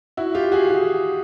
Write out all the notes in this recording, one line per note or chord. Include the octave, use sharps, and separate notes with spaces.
E4 F#4
F4 G4
F#4 G#4
F#4 G#4